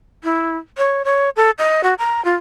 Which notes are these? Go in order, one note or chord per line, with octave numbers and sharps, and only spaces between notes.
E4
C#5
C#5
A4
D#5
F#4
A#5
F4